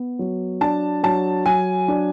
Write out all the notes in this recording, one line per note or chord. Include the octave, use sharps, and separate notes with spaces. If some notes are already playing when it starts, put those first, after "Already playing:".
Already playing: B3
F#3
D4 A5
F#3 A5
F#3 G#5
D4